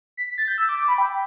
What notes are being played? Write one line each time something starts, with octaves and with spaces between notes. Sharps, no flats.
B6
B6
A6
G6
E6
D6
D6
B5
G5